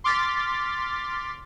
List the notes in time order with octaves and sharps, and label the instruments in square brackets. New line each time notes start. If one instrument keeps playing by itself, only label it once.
[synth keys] C6 D6 F6 A6 B6